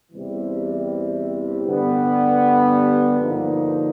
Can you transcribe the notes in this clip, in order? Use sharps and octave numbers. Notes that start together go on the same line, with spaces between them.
E2 C3 E3 G3
G2 D3 G3 B3
G2 D3 F3 A#3 D#4